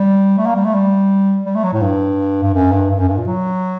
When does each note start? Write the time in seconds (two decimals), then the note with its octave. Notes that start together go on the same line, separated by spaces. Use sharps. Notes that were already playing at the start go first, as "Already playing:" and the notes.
Already playing: G3
0.38 A3
0.47 A#3
0.56 G3
0.65 A3
0.74 G3
1.46 G3
1.55 A3
1.64 F#3
1.73 A2
1.82 G2
2.43 G2
2.54 F#2
2.72 G2
2.90 G2
2.99 F#2
3.08 G2
3.17 A#2
3.27 F#3